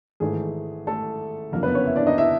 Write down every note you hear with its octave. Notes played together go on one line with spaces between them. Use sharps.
G#1 G#2 E3 A3 G#4
A3 A4
F#1 F2 D3 F#3 A#3 A#4
B3 B4
C#4 C#5
E4 E5
D4 D5
D#4 D#5
E4 E5